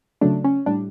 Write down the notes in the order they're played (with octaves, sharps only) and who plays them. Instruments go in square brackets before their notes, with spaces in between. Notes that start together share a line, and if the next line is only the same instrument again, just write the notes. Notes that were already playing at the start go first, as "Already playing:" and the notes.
[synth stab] C#3 F#3 A3 D4
C#4
A2 G3 D4